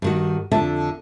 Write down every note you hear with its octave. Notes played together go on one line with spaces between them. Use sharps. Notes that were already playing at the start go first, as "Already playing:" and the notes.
G2 D#3 F#4
F2 D3 E5 A5